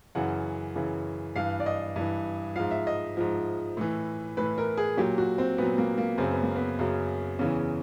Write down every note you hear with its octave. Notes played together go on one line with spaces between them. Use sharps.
F#2 C#3 E3 F#5
F#2 C#3 E3
G2 E3 F5
D5
D#5
G2 E3
G#2 F3 F5
E5
D#5
G#2 F3
A2 E3
A2 E3 B4
A#4
G#4
A#2 F#3 G4
F#4
C4
A#2 F#3 B3
A#3
A#3
F#2 C#3 F#3 C4
B3
A#3
B3
F#2 C#3 F#3
E2 C#3 E3 C#4